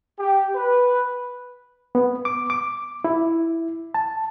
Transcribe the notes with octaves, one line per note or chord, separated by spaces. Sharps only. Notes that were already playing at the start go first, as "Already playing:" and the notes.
G4
B4
B3
D6
D6
E4
A5